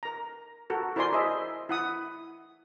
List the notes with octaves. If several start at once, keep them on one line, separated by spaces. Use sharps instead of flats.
A#4 A#5
F#4 A4 A#4
E4 A#4 C5 D5 G#5 C6
G#4 C5 D#5 E5
E4 F#5 D#6